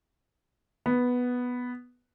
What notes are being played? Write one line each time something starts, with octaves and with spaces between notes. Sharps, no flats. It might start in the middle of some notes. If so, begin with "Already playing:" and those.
B3